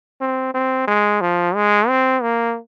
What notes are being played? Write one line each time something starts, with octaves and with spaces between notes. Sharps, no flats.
C4
C4
G#3
F3
G#3
C4
A#3